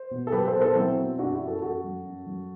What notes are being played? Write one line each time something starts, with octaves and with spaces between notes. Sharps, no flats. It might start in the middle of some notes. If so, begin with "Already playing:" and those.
Already playing: C5
B2
A4
F#3 G4 B4
A4 C5
B2
A4 C5
F#3 C4 E4
B2
F#2 D4 F#4
E4 G4
F#2
F#4 A4
F#2 F#4 A4
F#3
F#2
F#3